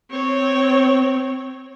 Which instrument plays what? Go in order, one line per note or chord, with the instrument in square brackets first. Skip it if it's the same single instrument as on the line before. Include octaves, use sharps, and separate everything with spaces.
[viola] C4 C#5